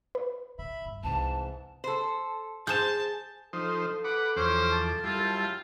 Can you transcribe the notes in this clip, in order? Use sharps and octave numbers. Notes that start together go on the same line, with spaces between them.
B4
D3 E5 B5
G2
C2 G#2 E3 A5
A4 C5
G#4 C5 A5 G6 E7
F3 D#4 A4 C5
B4 F#5 D6
E2 F3 C#4 C5 D6
A5
F#2 G3 E4 F4